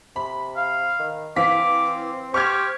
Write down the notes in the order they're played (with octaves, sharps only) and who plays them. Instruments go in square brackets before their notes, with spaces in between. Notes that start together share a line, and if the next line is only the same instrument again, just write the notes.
[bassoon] C3 [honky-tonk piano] B5
[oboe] F5
[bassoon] D#3
[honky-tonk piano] E3 F5 B6 [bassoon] C4 [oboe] D6
[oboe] G4 [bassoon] C5 [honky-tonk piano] C#6 F6 G#6